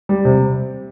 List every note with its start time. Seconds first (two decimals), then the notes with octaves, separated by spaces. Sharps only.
0.09 G3
0.25 C3